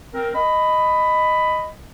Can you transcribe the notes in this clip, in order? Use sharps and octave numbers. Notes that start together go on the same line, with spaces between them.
C4 A#4
D#5 B5